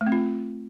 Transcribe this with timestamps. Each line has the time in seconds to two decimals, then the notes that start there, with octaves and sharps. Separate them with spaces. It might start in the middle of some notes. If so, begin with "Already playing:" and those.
0.01 A3
0.06 C4
0.12 F4